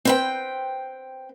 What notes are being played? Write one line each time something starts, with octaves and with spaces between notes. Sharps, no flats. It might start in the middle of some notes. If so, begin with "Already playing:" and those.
C4 B4 G5